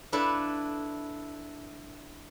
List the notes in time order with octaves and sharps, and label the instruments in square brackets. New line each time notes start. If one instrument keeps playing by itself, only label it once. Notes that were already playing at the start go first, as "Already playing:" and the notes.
[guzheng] D4 E4 A4 B4 F5